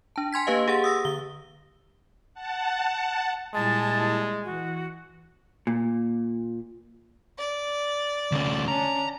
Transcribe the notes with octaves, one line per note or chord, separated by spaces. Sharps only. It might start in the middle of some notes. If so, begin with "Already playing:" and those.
D4 A5
G#5 C6 G#6 B6
A#3 G4 B4 D#5 F5
G4 G#4 F#5 A6
D#6 E6 A#6
D3 G7
F#5 A5
A#2 G3 G#3 E4 A5
E3 F#4
A#2
D5
D2 C#4
C#4 D4 A#5